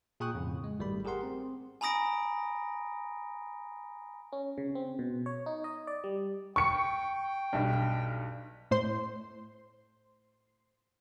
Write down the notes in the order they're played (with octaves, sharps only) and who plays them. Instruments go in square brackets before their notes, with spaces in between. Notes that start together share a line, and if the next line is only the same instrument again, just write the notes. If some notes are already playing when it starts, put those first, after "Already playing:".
[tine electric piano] A#2 G#4 G5 C#6 D#6 F#6
F2 A2 C#3
G#3
G#1 G3 A3 B5
G4 G#4 A#4 F#5 C6
C4
[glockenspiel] G#5 A#5 B5 D#6 A#6 D7
[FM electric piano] C#4
C#3
C4
B2
C#5
D#4
D#5
D5
G3
[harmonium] G5 [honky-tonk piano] C#6 C#7
[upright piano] B1 G2
[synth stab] A2 C5 C6